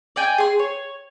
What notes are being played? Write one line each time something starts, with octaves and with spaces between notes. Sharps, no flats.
D5 D#5 G5 G#5
G#4 C6
C#5